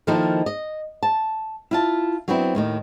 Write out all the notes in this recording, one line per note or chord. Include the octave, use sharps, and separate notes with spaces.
D#3 F3 A#3 D#4 E4 A4
D#5
A5
E4 F4 A5
F#3 B3 C4 D4 E4
D#2 A2 D#3